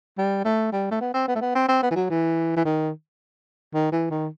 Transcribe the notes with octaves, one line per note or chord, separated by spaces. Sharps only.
G3
A3
G3
A3
B3
C4
B3
A3
B3
C4
C4
B3
E3
F#3
E3
E3
D#3
D#3
E3
D#3